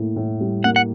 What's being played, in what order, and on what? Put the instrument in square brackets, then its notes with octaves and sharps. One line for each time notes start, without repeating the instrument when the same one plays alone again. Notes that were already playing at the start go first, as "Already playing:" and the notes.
Already playing: [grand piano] A2 A#3
A2
G3
[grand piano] A#3 [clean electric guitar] F#5
[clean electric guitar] F#5